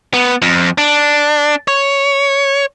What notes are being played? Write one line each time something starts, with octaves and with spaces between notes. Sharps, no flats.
B3
F2
D4
C#5